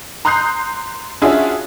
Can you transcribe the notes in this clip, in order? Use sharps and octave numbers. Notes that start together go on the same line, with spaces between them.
A#5 C6 D#6 F#6 G6 C7
C#4 D4 F4 F#4 G#4 E5